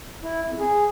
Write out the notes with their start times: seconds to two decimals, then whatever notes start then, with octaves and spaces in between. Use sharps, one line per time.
0.23 E4
0.46 F2
0.59 G#4